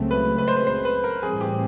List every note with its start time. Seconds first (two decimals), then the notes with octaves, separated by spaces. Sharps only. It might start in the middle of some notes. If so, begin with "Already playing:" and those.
Already playing: C#2 C#3 F#3 A3 C4
0.11 B4
0.38 B4
0.48 C5
0.56 B4
0.67 C5
0.85 B4
1.04 A#4
1.23 A2 E3 G3 C4 G#4
1.41 G4